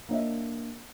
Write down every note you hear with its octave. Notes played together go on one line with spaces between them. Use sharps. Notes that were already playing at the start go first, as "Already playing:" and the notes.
A#3 D4 C#5 D#5 E5